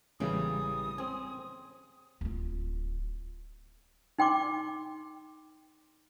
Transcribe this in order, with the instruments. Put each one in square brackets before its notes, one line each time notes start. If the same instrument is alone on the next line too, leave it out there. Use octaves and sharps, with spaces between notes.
[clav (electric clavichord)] A1 C#3 E3 [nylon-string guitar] G3 A#3 C#4 [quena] D#6
[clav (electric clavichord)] C4 G#5 [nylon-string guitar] C#4
[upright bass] D1 F4
[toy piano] D#4 G5 C6 D6